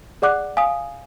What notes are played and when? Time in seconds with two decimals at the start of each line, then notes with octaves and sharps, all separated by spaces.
0.22 G#4 D5 F#5 D6 F#6
0.57 F5 G#5 D#6